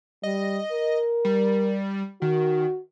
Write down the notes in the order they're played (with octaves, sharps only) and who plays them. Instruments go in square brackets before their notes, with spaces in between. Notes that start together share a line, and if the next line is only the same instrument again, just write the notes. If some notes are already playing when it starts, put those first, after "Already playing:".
[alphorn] G3 [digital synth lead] D#5
[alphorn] A#4
[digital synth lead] G3
[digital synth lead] D#3 [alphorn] F#4